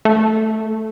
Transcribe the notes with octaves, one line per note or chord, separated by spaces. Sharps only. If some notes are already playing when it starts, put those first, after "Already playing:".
A3